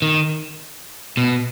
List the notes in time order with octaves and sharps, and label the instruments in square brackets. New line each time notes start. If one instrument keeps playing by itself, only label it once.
[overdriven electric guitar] D#3
B2